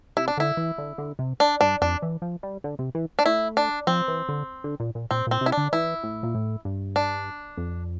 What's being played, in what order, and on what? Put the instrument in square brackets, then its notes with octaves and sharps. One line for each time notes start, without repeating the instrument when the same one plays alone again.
[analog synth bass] C3 [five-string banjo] E4
[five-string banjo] D4
[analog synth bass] D3 [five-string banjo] E4
[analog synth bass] E3
D3
D3
C3
[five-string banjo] D4
[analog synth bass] G2 [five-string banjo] D4
[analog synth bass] F2 [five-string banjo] D4
[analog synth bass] E3
F3
G3
D3
C3
E3
[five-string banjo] D4
[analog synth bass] A3 [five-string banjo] E4
[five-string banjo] D4
[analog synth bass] F3 [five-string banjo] C4
[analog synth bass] E3
D3
D3
A#2
A#2
[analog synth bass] A#2 [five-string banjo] C4
[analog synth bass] A#2 [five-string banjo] C4
[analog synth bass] C3
[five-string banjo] E4
D4
[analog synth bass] D3
[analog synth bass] E3 [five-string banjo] E4
[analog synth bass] A2
A#2
A2
G2
[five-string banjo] D4
[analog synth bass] F2